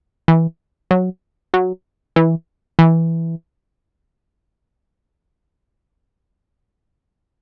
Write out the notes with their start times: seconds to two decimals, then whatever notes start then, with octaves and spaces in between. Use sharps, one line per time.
0.28 E3
0.91 F#3
1.54 F#3
2.16 E3
2.79 E3